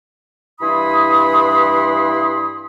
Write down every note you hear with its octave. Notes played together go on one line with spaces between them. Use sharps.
G2 E3 E4 B5 C6 D#6